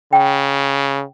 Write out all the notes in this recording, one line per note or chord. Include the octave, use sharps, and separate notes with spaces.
C#3 G5